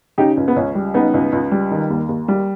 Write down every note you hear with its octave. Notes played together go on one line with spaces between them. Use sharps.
C#3 D#4 G4
C#2
B3
C#2 C#4
G3
C#3 B3 D#4
C#2
C#2
G3
D#3
D#2
D#2
G3